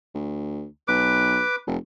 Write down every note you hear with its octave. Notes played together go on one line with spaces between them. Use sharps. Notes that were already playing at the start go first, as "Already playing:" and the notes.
D2
B1 B4 D6
F1